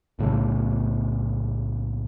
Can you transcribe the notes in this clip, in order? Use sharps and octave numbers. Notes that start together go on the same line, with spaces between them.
B1 A2 C#3 A3